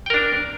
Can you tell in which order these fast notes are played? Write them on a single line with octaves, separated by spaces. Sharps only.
G5 A#4 D4